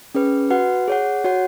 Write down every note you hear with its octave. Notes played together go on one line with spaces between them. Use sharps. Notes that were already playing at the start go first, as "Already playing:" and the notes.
C#4 G#4 B4
F#4 B4 F#5
G#4 C#5 F#5
F#4 C#5 F#5